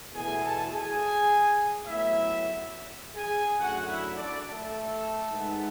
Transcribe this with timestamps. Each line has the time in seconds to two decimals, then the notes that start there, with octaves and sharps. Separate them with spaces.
0.13 E2 B2 A3 G#4 G#5
0.42 A4 A5
0.70 G#4 G#5
1.86 A2 F#3 B3 E4 E5
3.15 G#4 G#5
3.58 F#2 D3 F#3 A3 F#4 F#5
3.87 E4 E5
4.15 D4 D5
4.44 A3 A4
5.30 G#2 G#3 B3